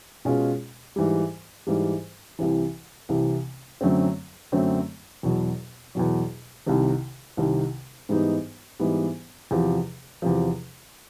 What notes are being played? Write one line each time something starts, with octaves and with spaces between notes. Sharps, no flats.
B2 G#3 C#4 F4
G#2 E3 G3
G#2 E3 G3
C2 C3 E3
C2 C3 E3
F#2 D3 F#3 A3 C4
F#2 D3 F#3 A3 C4
E2 B2 F#3
E2 B2 F#3
C2 C3 D#3
C2 C3 D#3
G#2 E3 G3 B3 D#4
G#2 E3 G3 B3 D#4
E2 C3 F3
E2 C3 F3